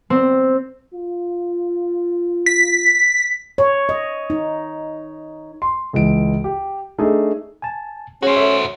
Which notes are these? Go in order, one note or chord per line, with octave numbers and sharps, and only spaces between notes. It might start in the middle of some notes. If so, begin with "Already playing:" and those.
C4
F4
B6
C#5
D#5
D#4
C6
C#2 E3 D7
G4
A3 D4 D#4 G#4
G#5 A5
C#4 F#4 G#4 C5
A4 C#5 E5